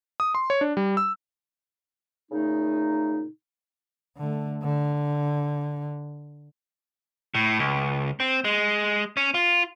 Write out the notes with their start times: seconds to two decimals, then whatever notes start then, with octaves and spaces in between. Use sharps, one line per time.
0.20 D#6
0.35 C6
0.50 C#5
0.61 D4
0.77 G3
0.97 E6
2.31 A#2 C#3 A3 D#4
4.17 D3 A3
4.62 D3
7.35 A2
7.59 C#2
8.20 C4
8.44 G#3
9.17 C#4
9.34 F4